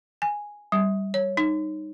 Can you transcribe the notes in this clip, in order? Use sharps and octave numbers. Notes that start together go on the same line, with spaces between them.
G#5
G3
C#5
D#4